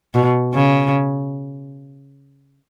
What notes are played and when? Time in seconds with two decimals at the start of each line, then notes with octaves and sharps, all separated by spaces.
0.14 B2
0.54 C#3